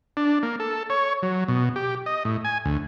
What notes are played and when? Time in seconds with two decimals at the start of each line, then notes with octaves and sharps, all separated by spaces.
0.17 D4
0.43 A#3
0.60 A4
0.90 C#5
1.22 F#3
1.48 B2
1.76 G4
2.06 D#5
2.25 A2
2.45 G#5
2.65 D2